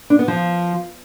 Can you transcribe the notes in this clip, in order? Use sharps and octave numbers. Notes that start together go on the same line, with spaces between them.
D4
B3
F3